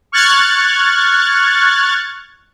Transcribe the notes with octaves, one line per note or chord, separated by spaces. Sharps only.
C#6 F6 F#6 G#6 A6